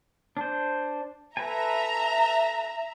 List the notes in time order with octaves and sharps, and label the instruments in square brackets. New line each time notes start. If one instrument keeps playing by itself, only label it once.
[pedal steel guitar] D4 C5
[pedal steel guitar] A4 B4 G#5 [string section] E5 A#5